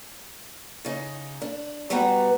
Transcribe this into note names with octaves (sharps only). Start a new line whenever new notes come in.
C#3 D#4
D4
B2 G3 B3 F#4 B4 A#5